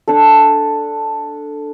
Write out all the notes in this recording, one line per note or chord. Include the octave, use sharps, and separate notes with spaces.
D4 A4